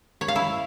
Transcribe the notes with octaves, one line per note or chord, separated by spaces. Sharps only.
C#5
F5
E4